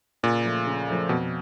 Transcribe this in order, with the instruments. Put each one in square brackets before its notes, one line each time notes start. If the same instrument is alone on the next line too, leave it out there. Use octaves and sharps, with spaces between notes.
[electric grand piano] A#2 [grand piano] C#3
[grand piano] F3 A3
C#3
F3 A3
[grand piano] F2 [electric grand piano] B2